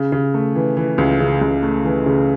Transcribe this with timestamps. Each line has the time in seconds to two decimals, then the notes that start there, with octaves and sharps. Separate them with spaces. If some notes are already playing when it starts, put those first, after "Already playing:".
Already playing: C#3
0.12 C#3
0.34 A3
0.55 E3
0.77 E3
0.98 C#2
1.20 C#3
1.41 C#2
1.63 A3
1.85 E3
2.06 C#3